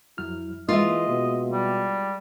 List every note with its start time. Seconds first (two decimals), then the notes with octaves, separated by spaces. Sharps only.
0.18 F2 F#3 E4 F6
0.69 E3 G#3 A#3 F4 D#5 E5
1.09 B2
1.52 G3